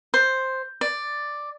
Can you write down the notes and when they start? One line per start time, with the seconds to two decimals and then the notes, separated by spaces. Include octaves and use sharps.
0.14 C5
0.81 D5